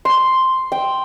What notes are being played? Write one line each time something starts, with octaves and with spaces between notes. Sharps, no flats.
C6
G5